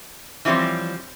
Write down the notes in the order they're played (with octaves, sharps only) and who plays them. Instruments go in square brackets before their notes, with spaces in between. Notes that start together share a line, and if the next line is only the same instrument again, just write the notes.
[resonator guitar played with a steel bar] E3 F3 G3 C4 C#5